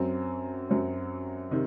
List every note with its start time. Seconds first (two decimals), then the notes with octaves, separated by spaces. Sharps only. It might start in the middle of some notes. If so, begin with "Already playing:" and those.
Already playing: F#2 F#3 C4
0.69 F#2 F#3 C4
1.51 C3 D#3